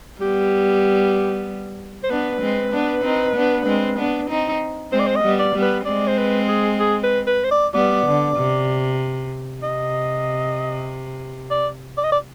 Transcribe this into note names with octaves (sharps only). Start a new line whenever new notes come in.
G3 B3 G4
C5
B3 D4 B4
G#3 C4
B3 D4
C4 D#4
B3 D4
G#3 C4
B3 D4
C4 D#4
G#3 C4 C5
D5
C5
D#5
G3 B3
D5
G3 B3
B4
G#3 C4 D5
C5
B4
G#4
G#4
B4
B4
C5
D5
G3 B3 D5
D3
C3
C3 D#5
D5
D5
D#5
D5